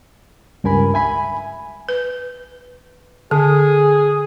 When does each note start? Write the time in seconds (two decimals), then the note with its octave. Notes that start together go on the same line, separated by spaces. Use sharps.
0.64 C#2 G2 A#4 G#5 B5
0.94 E5 G#5 B5
1.89 B4
3.31 D3 G#4